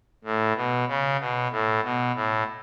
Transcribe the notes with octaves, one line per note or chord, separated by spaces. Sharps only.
A2
B2
C#3
B2
A2
B2
A2